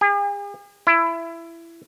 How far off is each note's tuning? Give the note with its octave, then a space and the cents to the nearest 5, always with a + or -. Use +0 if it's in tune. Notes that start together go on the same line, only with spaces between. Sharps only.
G#4 -45
E4 +20